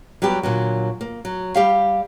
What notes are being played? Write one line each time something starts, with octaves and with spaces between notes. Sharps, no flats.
F#3 G3 B3 G4
A#2 D3 F#3
A#3
F#3
G3 G4 E5 F5